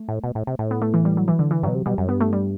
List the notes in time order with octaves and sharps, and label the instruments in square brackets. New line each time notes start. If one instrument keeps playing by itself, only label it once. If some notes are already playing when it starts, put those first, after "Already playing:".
Already playing: [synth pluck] A3
[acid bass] A2
B2
A2
C3
A2
[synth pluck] B3
A3
E3
G3
F#3
E3
D3
E3
[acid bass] G2 [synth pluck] F#3
[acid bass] B2
C3
[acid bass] B2 [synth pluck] G3
[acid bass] F#2
[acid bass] G2 [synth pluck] B3
[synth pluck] A3
G3